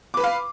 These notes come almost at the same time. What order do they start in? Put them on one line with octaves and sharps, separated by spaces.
D6 B4 B5 F5